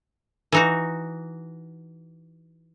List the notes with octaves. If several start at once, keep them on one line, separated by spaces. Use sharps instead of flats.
E3 D#4 F#4